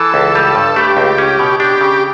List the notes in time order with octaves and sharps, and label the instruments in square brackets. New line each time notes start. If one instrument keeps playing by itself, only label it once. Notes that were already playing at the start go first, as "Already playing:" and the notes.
Already playing: [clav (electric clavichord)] E3 [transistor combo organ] A4
[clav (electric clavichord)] C#2
G3
G2
[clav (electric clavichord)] A3 [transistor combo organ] G4
[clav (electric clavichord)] C#2
C#4
B2
[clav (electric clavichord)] D4 [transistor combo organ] G4
[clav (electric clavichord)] C#3